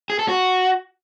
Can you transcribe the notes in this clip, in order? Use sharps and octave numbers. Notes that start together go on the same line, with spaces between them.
G#4
A4
F#4